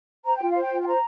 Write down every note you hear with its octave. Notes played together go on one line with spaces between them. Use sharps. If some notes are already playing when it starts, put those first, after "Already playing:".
C5 A#5
F4 G5
F5
C5
G5
F4
G5
C5 A#5